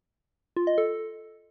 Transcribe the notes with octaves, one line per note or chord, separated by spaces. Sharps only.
F4
D#5
A4